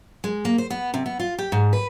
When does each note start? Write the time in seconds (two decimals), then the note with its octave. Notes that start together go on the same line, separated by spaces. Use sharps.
0.24 G#3
0.45 A#3
0.58 C5
0.70 B3
0.94 C3
1.06 B3
1.19 F4
1.38 G4
1.52 G#2
1.73 B4